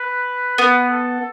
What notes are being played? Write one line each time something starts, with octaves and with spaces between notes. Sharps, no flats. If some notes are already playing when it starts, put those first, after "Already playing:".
Already playing: B4
B3 B4
A4